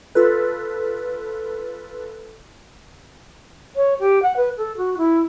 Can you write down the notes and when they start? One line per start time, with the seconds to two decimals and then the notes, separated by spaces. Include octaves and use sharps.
0.15 F4 A4 B4
3.75 C#5
3.99 G4
4.22 F#5
4.36 B4
4.57 A4
4.77 F#4
4.97 E4